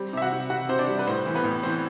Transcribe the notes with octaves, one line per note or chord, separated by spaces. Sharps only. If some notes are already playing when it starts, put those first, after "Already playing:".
Already playing: G3 C4
C3 E5
F#4 F#5
C3
C3 F#4 F#5
C3 C5
D4 D5
G3
B4
A2 C4 C5
E3
B3 B4
A2
E3 C4 C5